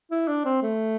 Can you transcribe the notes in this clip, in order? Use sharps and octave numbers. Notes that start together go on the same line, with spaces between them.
E4
D4
C4
A3